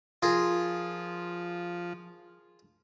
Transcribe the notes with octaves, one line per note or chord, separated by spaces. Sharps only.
F3 F4 G#4 A#4